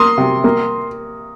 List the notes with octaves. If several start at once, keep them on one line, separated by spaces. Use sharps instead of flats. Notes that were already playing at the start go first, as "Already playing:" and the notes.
Already playing: A#3 C6 D#6
C3
A#3